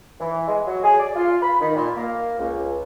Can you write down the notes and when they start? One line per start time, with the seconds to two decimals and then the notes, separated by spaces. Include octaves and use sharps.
0.20 E3
0.48 G#3
0.67 F#3
0.84 G#4
0.99 D5
1.16 F4
1.43 B5
1.60 D#3
1.76 A#2
1.97 A#3
2.39 C#2